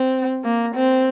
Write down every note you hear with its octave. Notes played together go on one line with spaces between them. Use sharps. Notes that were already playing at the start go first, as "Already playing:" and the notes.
Already playing: C4
A#3
C4